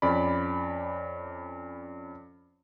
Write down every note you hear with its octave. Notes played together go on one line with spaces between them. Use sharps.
F2 C#4 D5 B5